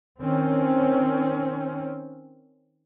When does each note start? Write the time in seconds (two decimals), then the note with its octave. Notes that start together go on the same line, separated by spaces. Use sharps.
0.21 D#3 C4 C#4